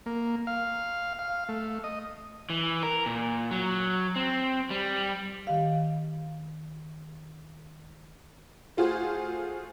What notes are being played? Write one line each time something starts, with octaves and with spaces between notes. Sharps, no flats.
A#3
F5
F5
A3
D#5
E3
A#4
A#2
F#3
C4
G3
D#3 G4 F5
A3 F4 F#4 G#4 C5